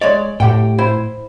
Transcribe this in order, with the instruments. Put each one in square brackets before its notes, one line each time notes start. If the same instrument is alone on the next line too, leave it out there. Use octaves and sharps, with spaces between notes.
[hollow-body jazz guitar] G#3 C#5 D5
[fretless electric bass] A2 [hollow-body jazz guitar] G4 F#5 G5
[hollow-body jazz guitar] E4 C5